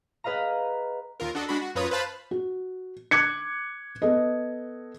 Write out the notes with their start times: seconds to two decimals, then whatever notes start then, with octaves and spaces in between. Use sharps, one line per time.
0.24 G#4 B4 D#5 F5 A#5
1.20 D#2 F4 A#4
1.35 D4 F#4 A4 D#5
1.49 G#3 D4 F#4 B5
1.62 F#4
1.75 F#2 F4 B4 C#5 A#5 D#6
1.91 B4 C5 F5 A5 B5
2.31 F#4
3.11 D6 F#6 G#6 C#7
4.02 B3 A4 D#5